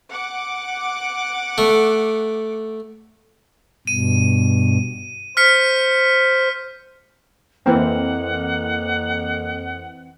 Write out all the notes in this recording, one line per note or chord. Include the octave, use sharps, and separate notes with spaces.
F#5 D6
A3
G2 B2 D#7
C5 F6 B6 C#7
F2 E3 A#3 C4 F#5